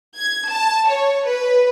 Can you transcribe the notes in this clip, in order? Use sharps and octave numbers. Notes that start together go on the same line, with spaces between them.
G#6
A5
C#5
B4